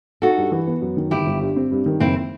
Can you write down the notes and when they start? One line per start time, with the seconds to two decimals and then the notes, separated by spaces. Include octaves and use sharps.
0.22 D#4 F#4 A4
0.37 G2
0.52 E3
0.67 B3
0.82 F#2
0.97 D#3
1.11 G1 E4 G4
1.26 G1
1.41 G2
1.56 C4
1.71 G2
1.86 D#3
2.00 F#1 C4 E4